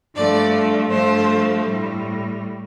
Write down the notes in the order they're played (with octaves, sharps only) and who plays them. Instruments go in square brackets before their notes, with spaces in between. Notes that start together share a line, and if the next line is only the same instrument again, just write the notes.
[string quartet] G2 F3 A3 D5
G2 F3 A3 C5
A2 G3